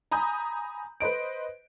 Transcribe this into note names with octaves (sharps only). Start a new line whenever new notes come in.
G#5 A#5 B5 D#6 G6
B4 C5 D#5 D7